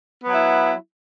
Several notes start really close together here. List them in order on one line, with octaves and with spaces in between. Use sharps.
B3 F#3 E4